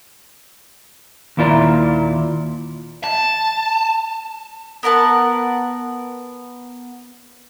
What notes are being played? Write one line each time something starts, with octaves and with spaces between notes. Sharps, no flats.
D#2 A#2 E4 F4 D5 A#5
A5
B3 A#4 F#5 A5